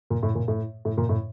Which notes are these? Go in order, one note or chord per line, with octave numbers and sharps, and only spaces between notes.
A#2
A2
A#2
A2
A2
A#2
A2